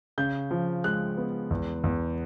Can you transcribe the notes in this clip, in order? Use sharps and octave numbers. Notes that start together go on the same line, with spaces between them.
C#3 G6
F3
G#3 F#6
B3
E2
E2